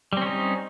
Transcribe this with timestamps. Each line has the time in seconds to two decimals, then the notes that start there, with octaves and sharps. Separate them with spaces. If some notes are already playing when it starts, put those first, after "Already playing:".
0.13 G3
0.17 C4
0.22 C#4
0.26 D#4